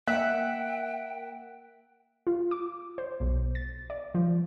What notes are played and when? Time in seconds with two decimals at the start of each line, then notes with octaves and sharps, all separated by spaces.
0.07 A#3 E5 F#5 G5 F#6
2.27 F4
2.51 D6
2.98 C5
3.20 B1
3.55 A6
3.90 D5
4.15 F3